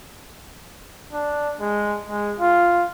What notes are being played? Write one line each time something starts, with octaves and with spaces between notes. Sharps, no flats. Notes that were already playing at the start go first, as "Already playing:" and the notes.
D4
G#3
G#3
F4